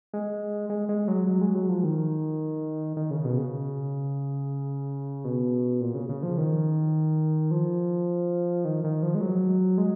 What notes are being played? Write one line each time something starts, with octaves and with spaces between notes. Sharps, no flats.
G#3
G#3
G#3
F#3
F#3
G#3
F#3
F3
D#3
D#3
C#3
B2
C#3
B2
A#2
C#3
C#3
F3
D#3
F3
D#3
D#3
F3
G#3
F#3
G#3